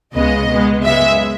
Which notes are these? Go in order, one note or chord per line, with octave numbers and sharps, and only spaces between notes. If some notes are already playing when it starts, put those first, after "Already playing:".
C#2 C#3 G#3 B3 D#5
B2 G#3 B3
F#2 C#3 G#3 B3 E5